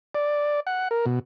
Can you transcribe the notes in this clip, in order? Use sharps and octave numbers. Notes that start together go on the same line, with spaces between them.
D5
F#5
A#4
B2